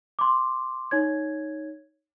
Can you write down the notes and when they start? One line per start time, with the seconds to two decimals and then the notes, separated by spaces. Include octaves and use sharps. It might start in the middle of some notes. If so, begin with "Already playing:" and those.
0.19 C6 D6
0.91 D#4 C#5 G#6